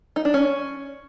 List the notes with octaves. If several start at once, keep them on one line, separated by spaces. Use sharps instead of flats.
D#4
D4
C#4